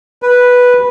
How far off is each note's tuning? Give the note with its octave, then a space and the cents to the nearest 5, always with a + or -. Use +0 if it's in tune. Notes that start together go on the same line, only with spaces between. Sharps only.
B4 -5